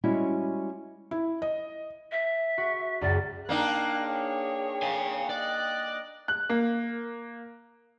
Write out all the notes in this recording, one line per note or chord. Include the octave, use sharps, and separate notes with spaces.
G3 G#3 C#4 E4 F#4
E4
D#5
E5
F#4
C#2 F#2 D5
A#3 D4 D#4 G5 F#6
G#4 C#5
F5 G#5
D5 D#5 F#6
F#6
A#3